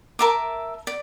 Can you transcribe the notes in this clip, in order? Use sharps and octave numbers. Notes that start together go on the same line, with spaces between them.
A#4 E5 A5 D6
D5